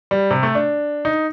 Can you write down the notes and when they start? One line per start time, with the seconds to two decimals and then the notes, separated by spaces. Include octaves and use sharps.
0.11 G3
0.31 C3
0.43 A3
0.55 D4
1.05 D#4